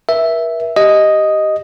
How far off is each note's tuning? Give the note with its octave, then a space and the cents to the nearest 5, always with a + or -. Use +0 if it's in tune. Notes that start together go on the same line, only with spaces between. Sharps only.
A#4 +45 E5 +0
G4 -10 D#5 +0